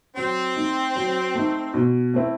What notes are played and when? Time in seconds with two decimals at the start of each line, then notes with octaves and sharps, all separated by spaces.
0.16 F#3 C4
0.56 A3 D#4
0.96 F#3
1.35 A3 D#4
1.74 B2
2.14 A3 C4 E4